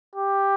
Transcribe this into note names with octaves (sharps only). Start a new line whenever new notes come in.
G4